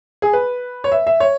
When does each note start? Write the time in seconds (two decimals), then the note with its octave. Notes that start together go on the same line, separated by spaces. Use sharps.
0.22 G#4
0.33 B4
0.84 C#5
0.92 E5
1.07 E5
1.20 C#5